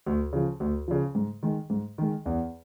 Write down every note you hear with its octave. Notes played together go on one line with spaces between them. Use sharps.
D2
C#3 F3
D2
C#3 F3
G#2
D#3 G#3
G#2
D#3 G#3
E2